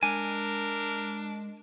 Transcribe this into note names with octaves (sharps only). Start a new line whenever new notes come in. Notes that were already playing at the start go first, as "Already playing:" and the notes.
G#3 D4 A#4 G#5